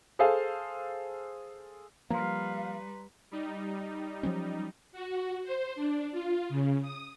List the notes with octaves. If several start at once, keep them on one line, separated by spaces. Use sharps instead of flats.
G#4 A4 C5 F5
F3 G3 A#3 B4 F5 A#5 C6
G3 D#4
F3 F#3 C#4
F#4
C5
D4
F4
C#3
D#6